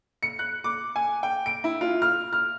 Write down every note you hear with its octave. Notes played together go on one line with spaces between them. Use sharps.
C#7
F#6
D6
G#5
G5
D7
E4
F4
F6
F6